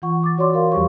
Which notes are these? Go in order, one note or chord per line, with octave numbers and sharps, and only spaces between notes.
E3 F4 F#5 C#6
D6 A6
F#4 C#5 D5 C6 D6
A#4 F5
E2 F3 G3 G4 C5 C#6